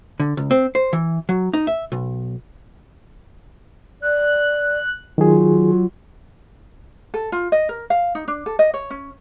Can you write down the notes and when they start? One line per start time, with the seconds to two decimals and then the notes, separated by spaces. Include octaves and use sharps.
0.20 D3
0.37 C#2
0.51 C4
0.75 C5
0.93 E3
1.29 F#3
1.54 D#4
1.67 E5
1.92 B1
4.02 D5 F#6
5.18 D#3 F#3 F4 G#4
7.14 A4
7.32 F4
7.52 D#5
7.69 A#4
7.90 F5
8.15 D#4
8.28 D4
8.46 A4
8.59 D#5
8.74 C#5
8.90 C#4